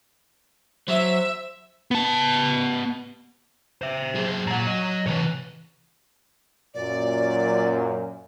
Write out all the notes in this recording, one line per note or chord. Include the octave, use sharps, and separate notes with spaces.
F#3 C5 E5
B3 A5
C5 E5
F#3 G#4
A#2 F#3 F#5 A#5
D#5
C3 E3 B4 C#5
F#2 A#2 D5